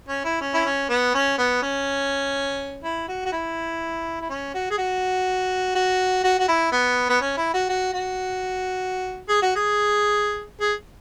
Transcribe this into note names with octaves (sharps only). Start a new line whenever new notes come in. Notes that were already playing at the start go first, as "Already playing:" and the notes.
C#4
E4
C#4
E4
C#4
B3
C#4
B3
C#4
E4
F#4
F#4
E4
E4
C#4
F#4
G#4
F#4
F#4
F#4
F#4
E4
B3
B3
C#4
E4
F#4
F#4
F#4
G#4
F#4
G#4
G#4